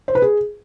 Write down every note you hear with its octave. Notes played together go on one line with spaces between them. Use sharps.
C5
B4
G#4